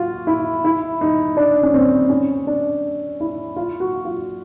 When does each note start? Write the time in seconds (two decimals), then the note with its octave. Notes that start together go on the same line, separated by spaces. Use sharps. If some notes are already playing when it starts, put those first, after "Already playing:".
Already playing: F4 F#4
0.27 E4
0.64 E4
1.01 D#4
1.37 D4
1.63 C#4
1.74 C4
2.10 C#4
2.47 D4
3.20 E4
3.56 F4
3.80 F#4
4.05 F4